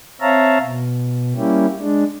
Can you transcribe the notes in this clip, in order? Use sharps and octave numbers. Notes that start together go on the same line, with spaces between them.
C4 C#5 E5 F5 A5 A#5
B2
G3 A#3 C#4 E4 G4
G#3 D4